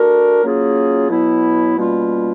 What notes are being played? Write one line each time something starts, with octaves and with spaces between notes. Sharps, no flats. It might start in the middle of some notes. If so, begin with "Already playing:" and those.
Already playing: A3 D4 F#4 A#4
F#3 A#3 C#4 F4 G#4
B2 F#3 B3 E4
B2 G3 A#3 C#4 F4